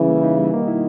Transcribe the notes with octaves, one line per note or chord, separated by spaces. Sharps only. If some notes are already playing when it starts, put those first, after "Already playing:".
Already playing: C#3 E3 G3
A#3
D#4
G3
B2 D#3 A#3
E4